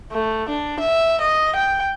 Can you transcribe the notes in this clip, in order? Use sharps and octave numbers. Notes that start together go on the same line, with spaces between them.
A3
D4
E5
D#5
G5